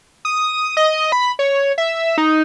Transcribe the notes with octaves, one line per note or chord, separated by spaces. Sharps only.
D#6
D#5
B5
C#5
E5
D#4